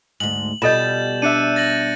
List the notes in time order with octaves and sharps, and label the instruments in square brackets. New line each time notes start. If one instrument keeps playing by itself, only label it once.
[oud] D2 G#2 [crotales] F#7
[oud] B2 G3 [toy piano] F4 A4 D#5 [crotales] G6 A6 E7
[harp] D4 E5 [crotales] F#6 C#7 D#7
[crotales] A6 A#6 F#7